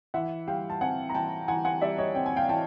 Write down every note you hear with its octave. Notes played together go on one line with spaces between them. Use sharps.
E3 E5 F#5
G3 F5 G5
A5
C4 F#5 G#5
A#5
E3 G5 A5
E3 F#5 G#5
F#5 G#5
G3 D5 E5
C#5 D#5
C4 G5
G#5
F5 G5
E3 G5 A5